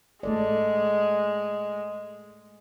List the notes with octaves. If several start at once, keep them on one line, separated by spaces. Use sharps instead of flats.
G#3 A3 A4 D5